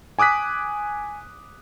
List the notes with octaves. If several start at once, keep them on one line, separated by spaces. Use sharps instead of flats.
G#5 D6 D#6 F#6 B6